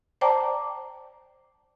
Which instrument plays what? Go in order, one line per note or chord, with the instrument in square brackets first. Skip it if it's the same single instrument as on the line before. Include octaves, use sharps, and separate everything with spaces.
[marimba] C5 D5 G5 A5 A#5 D6